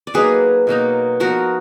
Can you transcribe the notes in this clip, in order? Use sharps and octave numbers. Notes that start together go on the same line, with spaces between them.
D5
F#3 A#3 D#4 G#4 B4
B2 F#3 A#3 D#4
F3 B3 D#4 F#4 A#4